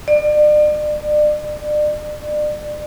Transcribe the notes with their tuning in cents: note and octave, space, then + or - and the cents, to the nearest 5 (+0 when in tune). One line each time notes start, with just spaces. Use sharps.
D5 +35